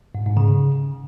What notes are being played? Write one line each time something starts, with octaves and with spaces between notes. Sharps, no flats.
G#2
G#2
C#3